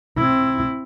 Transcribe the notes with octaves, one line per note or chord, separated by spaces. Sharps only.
C4 E4